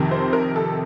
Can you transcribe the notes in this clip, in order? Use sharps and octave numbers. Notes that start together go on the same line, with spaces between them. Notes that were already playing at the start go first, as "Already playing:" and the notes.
Already playing: F2 C3 D#3
C5
A#4
A4